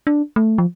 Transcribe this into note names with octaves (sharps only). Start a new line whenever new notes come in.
D4
A3
F3